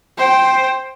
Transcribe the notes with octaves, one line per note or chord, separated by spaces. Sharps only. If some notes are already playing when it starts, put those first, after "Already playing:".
C5 G5